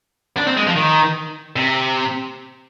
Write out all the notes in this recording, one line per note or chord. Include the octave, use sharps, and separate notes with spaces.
D4
C4
G#3
F3
D#3
C3